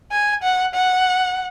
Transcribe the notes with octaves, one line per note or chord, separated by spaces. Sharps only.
G#5
F#5
F#5